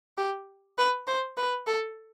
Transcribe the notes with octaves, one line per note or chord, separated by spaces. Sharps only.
G4
B4
C5
B4
A4